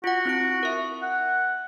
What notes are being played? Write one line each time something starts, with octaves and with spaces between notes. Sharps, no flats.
F4 F#4 F#5
C4 E4 D7
A#4 E5
F#5